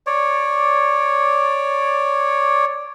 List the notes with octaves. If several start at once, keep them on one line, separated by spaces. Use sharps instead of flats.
C#5 D5